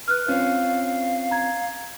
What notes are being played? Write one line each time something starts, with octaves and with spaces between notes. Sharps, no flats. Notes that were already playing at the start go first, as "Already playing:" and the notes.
B4 F6 F#6
C4 C#4 F4 F5
A#5 G#6